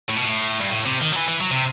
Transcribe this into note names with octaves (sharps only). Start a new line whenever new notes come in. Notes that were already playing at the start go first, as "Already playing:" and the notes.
A2
B2
A2
G2
A2
C3
D#3
F#3
E3
E3
F#3
C3